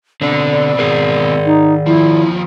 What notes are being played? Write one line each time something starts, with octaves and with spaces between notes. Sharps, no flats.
B2 D3 C4 D4 D5
D#3 G#4 A#4
D#4
D#2 F3 E4